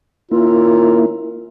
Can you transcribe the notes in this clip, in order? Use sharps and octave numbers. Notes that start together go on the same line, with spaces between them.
D#3 A#3 C#4 E4 F4 A#4